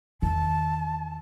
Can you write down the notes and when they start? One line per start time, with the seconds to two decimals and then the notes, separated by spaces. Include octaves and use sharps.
0.22 E2 D#3 A5